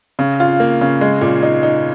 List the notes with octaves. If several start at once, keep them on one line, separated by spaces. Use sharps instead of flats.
C#3
F4
A#3
C#3
G#3
A#2
D#4
D#4